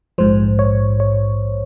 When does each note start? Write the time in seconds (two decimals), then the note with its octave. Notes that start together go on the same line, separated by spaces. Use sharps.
0.18 A#1 G#2 F3 C5
0.59 C#5
1.00 C#5